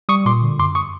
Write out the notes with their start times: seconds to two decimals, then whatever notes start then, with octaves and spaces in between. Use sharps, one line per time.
0.09 G3 C#6 D#6
0.26 A#2 C6 D6
0.42 D3
0.59 F#2 C6 D6
0.75 C#6 D#6